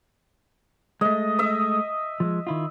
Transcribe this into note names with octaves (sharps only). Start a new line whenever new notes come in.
G#3 A3 D#5
D#5 E5
F3 F#3 G#3
D#3 E4 F4